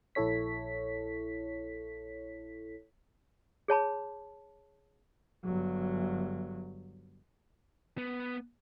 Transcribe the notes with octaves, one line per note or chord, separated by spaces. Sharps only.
A#1 E4 A4 C#5 B6
G#4 C#5 A5 B5
G1 F#3
B3